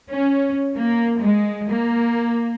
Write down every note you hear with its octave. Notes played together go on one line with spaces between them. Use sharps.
C#4
A#3
G#3
A#3